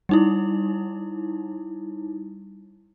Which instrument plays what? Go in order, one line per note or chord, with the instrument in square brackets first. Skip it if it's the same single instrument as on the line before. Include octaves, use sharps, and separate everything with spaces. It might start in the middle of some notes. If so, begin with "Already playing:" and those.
[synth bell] G3 D#4 E4